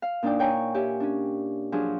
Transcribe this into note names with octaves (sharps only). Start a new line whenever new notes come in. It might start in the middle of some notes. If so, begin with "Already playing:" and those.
F5
A#2 D4 D#4 D5 G5
C#5 G5 G#5 A#5 C#6
G4 C#5 E5 G#5
C#4 D4
F3 F#3 D4 G#4